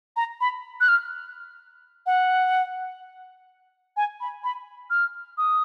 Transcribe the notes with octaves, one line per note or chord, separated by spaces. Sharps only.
A#5
B5
F#6
F6
F#5
G#5
B5
B5
F6
D#6